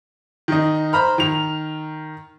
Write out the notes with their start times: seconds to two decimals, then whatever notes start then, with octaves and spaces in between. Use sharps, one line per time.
0.48 D#3 D#4
0.93 C5 A#5 B5 F6
1.18 D#3 F7